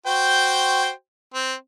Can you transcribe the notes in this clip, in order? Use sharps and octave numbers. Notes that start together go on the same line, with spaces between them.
F#4 C5 G5
C4